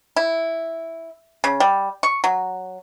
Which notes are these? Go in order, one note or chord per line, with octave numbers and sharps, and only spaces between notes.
E4
C#3
G3
C#6
F#3